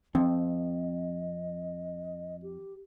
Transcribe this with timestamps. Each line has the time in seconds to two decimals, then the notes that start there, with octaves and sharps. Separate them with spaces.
0.15 F2 C4 D#5
2.42 G4